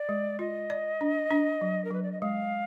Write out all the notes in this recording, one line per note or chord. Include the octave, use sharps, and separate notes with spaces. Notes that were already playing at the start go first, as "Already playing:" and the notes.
Already playing: D5
G#3
F4 D#5
D5
D4
D4
F#3
A#4
F#3 B4
D5
D#5
G#3 F5